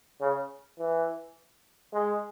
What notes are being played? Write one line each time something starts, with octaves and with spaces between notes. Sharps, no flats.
C#3
E3
G#3